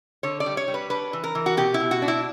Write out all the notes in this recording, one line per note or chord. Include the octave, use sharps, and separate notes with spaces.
D3 C#5
D5
G3
C#5
G3
B4
D4 B4
E3
A#4
E3
F#4
B2 G4
E4
B2
F#4
D4
E4